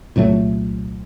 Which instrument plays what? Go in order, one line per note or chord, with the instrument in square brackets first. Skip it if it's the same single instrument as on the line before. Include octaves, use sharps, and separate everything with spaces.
[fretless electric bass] C2 A#2 F#3 A3